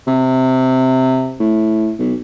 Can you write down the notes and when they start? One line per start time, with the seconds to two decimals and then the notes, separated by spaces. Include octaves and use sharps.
0.07 C3
1.39 A2
1.99 B1